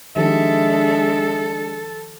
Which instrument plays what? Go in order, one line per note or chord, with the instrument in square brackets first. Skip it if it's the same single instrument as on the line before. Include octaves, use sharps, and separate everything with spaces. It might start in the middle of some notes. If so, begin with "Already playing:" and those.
[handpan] D#3 F3 G4 [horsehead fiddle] G#3 D4 [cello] A4 [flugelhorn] E5